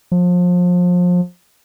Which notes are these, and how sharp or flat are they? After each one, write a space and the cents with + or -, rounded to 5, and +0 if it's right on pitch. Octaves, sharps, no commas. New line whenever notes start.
F3 +30